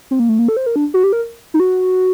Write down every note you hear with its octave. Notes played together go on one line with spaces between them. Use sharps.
C4
A#3
A3
A#3
A4
C5
A#4
D4
F#4
G4
A#4
D#4
F#4